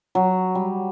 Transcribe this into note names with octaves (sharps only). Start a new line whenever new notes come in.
F#3
G3